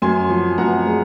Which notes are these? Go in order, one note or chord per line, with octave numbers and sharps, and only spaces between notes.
F#2 G#5 C6
F3
F#2 F#5 A#5
G#3